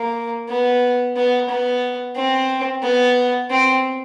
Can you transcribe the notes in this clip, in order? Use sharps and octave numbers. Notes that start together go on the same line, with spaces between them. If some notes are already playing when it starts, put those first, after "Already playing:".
Already playing: A#3
B3
B3
B3
C4
B3
C4